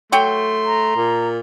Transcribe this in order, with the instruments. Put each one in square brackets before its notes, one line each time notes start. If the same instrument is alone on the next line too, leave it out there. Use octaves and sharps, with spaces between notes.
[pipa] F#3 C#5 G5 [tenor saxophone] A3 [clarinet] C6
[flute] A#5
[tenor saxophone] A#2